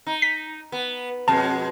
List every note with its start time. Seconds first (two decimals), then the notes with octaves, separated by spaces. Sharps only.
0.07 D#4
0.22 B6
0.72 B3
1.28 F2 B2 G#3 A5